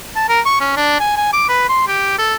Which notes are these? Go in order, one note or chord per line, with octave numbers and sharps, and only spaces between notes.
A5
A#4
C#6
C#4
D4
G#5
G#5
D6
B4
C6
G4
A4